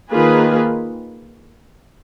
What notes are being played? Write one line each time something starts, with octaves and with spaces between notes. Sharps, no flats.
D#3 A#3 F4 G#4 B4